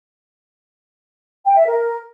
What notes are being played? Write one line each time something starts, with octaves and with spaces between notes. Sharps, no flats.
G5
E5
A#4